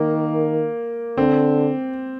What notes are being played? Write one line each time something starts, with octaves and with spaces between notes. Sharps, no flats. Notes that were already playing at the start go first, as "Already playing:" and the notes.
Already playing: D#3 A#3
D3 C4